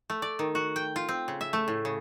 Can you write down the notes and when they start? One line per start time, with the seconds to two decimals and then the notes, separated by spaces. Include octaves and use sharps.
0.10 A3
0.22 D5
0.39 D#3
0.55 F#4
0.76 G5
0.96 F4
1.09 C4
1.28 C#3
1.41 E5
1.53 A3
1.68 A2
1.85 C#3